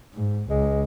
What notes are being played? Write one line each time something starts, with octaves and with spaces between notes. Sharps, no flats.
G#2
C#2 G#3